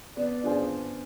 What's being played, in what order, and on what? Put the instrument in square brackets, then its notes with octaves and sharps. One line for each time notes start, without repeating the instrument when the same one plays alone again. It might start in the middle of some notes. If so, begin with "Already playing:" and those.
[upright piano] B3 [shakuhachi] D5
[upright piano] D4 F4 G#4 C5